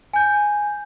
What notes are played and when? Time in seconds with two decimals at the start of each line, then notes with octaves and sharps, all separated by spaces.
0.13 G#5 G6